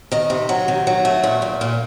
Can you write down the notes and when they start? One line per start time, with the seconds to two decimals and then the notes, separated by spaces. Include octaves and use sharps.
0.12 D#3 D#5
0.30 C3
0.49 F#3
0.68 D#3
0.87 F#3
1.05 A3
1.24 A#2
1.42 A#2
1.61 A#2